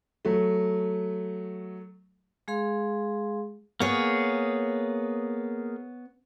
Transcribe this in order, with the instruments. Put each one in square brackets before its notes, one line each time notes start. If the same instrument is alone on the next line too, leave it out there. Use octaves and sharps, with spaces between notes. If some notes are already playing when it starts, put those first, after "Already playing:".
[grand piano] F#3 A3
[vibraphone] G#3 G#4 F5 C6
[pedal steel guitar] A#3 G#4 [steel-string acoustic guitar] B3 C#5